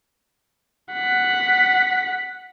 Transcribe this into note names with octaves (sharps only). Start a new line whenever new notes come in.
F#5 B6